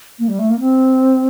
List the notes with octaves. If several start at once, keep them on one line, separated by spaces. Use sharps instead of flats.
A#3
G3
A3
A#3
C4